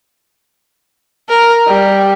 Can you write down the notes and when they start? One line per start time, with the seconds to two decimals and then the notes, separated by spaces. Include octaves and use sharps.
1.29 A#4
1.67 G3